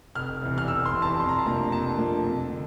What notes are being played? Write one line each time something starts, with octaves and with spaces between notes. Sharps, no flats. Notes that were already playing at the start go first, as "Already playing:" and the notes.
F1 F6
E2 C3
F6
F1 E6
C6
E2 C3
A5
F2 C6
A#5
A5
C3 F3 A#3 D4 A#5
F2 A5
C3 F3 A#3 D4
F2
D3